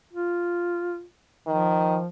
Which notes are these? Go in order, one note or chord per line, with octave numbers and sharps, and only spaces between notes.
F4
D#3 F3